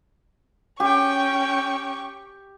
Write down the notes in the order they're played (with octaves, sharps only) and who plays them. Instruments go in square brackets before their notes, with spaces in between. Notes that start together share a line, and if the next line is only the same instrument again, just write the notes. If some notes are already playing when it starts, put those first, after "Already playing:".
[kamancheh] C#4 G5 [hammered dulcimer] G4 [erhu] C#6